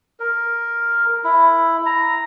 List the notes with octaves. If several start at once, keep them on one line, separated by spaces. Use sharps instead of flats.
A#4
E4
A#5